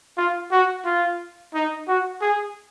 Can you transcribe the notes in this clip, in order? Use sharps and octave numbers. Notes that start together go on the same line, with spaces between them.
F4
F#4
F4
D#4
F#4
G#4